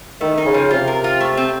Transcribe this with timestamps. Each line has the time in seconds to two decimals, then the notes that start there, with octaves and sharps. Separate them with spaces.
0.21 D#3 A3
0.38 D#4
0.46 C#3
0.54 F3
0.71 C3 F4
0.87 A#4
1.04 F4
1.21 A3
1.37 C4